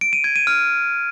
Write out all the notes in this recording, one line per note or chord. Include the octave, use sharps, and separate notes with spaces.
D7
D#7
G#6
D#7
F6